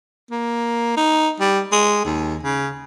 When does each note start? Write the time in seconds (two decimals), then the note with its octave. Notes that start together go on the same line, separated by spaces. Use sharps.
0.31 A#3
0.97 D#4
1.40 G3
1.72 G#3
2.05 D#2
2.43 C#3